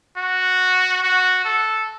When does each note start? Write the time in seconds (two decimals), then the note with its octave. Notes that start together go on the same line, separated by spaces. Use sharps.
0.18 F#4
1.03 F#4
1.45 A4